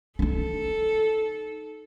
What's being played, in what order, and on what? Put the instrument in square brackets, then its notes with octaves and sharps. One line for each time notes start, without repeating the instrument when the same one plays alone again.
[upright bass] D#4 E4 [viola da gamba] A4